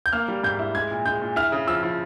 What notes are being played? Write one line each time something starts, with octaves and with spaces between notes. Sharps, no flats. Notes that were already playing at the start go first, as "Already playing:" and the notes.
G6
A#3 F6
G3
G#2 G6
E4
G#3 G#6
A#2
G#3 G6
A#2
E4 F6
C#3
F3 E6
F3